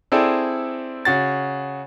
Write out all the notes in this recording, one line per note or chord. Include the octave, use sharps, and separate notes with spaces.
C4 E4 G#4 A4 D5 G5
C#3 F#4 A6